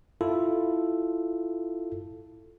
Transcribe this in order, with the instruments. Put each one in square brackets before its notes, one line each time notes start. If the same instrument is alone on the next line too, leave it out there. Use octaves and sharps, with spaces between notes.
[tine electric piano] E4 F4 A4